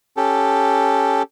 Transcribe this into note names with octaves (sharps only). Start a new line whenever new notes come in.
C#4 G4 A4